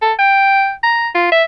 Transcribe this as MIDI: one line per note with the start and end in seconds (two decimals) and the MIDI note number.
0.02 0.13 69
0.19 0.72 79
0.83 1.09 82
1.15 1.28 65
1.32 1.43 76